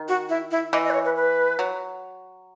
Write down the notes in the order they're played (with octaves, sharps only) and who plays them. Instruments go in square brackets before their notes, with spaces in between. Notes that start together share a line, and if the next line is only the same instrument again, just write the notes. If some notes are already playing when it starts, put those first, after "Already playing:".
Already playing: [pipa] D#3
[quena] F#4
E4
E4
[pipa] E3 [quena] D#5
[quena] D#5
B4
C#5
B4
B4
[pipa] F#3